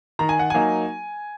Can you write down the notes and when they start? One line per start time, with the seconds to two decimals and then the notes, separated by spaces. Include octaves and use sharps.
0.19 D#3 A#5
0.29 G#5
0.39 F#5
0.50 F#3 A#3 D#4 G#5